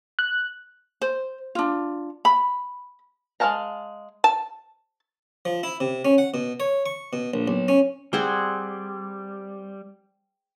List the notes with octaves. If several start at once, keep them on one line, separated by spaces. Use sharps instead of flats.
F#6
C5
D4 F4
B5
G#3 A#4 F5 A5 A#5
A5
F3
E4
C3
C#4
F#5
B2
C#5
C#6
B2
A#1
B1
C#4
G3 C4 G#4 F#5